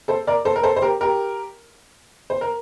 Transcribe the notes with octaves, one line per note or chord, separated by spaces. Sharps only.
A4 C5
A#4 D5
A4 C5
A#4
A4 C5
C5
G4 A#4
G4 A#4
C5
A#4